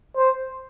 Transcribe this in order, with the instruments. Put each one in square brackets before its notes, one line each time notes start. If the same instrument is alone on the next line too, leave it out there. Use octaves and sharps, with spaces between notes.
[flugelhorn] C5